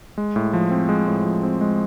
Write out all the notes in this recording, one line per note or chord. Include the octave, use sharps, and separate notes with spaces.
G#3
A2
F3
C4
G#3
A2
F3
C4
G#3